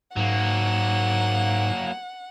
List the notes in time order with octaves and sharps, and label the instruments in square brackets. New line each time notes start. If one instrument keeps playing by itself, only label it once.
[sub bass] G#2 [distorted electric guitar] F#3 A#3 [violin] F#5